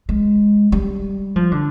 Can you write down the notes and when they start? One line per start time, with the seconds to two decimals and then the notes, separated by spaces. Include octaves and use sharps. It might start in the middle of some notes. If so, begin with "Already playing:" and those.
0.09 G#3
0.72 G3
1.36 F3
1.51 D3